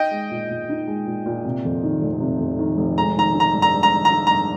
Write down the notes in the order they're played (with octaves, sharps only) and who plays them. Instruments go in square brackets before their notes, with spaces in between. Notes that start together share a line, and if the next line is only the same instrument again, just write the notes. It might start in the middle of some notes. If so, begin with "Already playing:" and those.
Already playing: [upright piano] D#4 [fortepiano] D#5 G5
[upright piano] G#3
A#2
A#2
D#4
G#3
A#2
A#2
C3
F2
D#3
F1
C3
F2
D#3
F1
[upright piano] G#3 [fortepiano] A#5
[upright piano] D#3 [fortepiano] A#5
[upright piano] D#4
[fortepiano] A#5
[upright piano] G2
[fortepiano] A#5
[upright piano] G#3
[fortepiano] A#5
[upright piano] D#3
[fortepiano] A#5
[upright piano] D#4
[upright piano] G2 [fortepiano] A#5